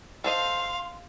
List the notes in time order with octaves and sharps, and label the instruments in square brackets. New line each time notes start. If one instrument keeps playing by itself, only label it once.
[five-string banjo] A4 C5 D#5 [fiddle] F5 [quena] C6